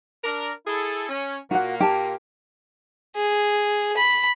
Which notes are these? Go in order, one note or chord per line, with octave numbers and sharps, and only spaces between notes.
D4 A#4
E4 G#4 A4
C#4
A#2 A#3 F#4 F#5
G4 A5
G#4
B5